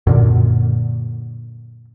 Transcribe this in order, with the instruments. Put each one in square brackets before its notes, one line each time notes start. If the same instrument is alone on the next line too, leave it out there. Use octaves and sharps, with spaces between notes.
[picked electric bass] F#2 A#2 D3